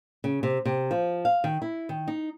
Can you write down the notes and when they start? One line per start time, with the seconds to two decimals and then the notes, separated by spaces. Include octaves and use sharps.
0.24 C#3
0.43 C3
0.65 C3
0.91 F3
1.25 F5
1.44 D#3
1.62 E4
1.89 D#3
2.08 D#4